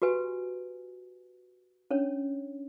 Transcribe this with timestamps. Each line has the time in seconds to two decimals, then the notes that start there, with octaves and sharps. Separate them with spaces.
0.02 F#4 G4 B4 G#5
1.91 C#4 D4 C#5